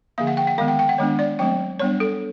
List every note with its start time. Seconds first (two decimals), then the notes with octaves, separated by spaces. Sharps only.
0.18 D3 F3 A#3 F5
0.27 F#5
0.37 G5
0.47 F#5
0.58 D#3 G#3 B3 F5
0.68 G5
0.79 G5
0.89 F#5
0.98 D#3 G#3 B3 D4 C#5
1.19 D5
1.39 F#3 A3 C4 G5
1.79 G3 B3 D4 C#5
2.00 A4